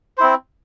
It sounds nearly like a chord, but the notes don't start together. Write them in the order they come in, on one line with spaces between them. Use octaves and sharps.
C5 E4 C4